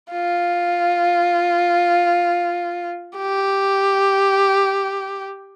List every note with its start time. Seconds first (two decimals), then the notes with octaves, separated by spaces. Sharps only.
0.12 F4
3.17 G4